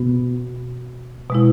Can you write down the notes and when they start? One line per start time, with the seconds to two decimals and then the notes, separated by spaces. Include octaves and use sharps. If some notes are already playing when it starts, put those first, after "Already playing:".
Already playing: B2 B3 F#4
1.30 B2 G#3 E4